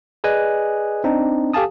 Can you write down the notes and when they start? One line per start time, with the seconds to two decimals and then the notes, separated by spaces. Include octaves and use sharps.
0.24 G#4 B4 D5 D#5 G#5 F#6
1.04 C4 D4 D#4
1.54 G4 A4 F5 G#5 A5 D#6